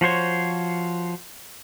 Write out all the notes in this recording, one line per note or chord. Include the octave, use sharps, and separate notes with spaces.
F3 F#4 C5 C#5